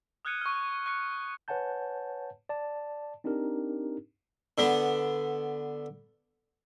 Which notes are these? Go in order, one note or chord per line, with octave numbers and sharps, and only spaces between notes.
D#6 F6 F#6 G#6 C#7 D#7
C#6 F6
C#6 F#6 C#7
B4 C#5 F#5 G#5 A5 G6
D5 A5
C4 D4 D#4 G4 A#4
D3 B3